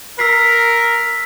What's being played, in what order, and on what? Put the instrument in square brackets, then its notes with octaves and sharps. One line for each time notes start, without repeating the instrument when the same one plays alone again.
[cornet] A#4 [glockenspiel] E6 B6 C7